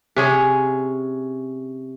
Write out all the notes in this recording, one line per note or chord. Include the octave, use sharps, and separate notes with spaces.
C3 C#4 G#4